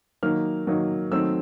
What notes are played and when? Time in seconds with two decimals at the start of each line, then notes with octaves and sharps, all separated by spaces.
0.23 D#3 F#3 A#3 D#4 F6
0.67 D#3 F#3 A#3 D#4
1.12 D#3 F#3 A3 C4 D#4 E6